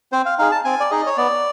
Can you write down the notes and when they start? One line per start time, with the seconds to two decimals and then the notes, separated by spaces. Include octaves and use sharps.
0.12 C4 C5
0.26 F5
0.39 D#4 G#4 F5
0.52 A5
0.65 C4 G#5
0.80 D5
0.91 D#4 G#4 D#5
1.06 C#5
1.17 B3 D5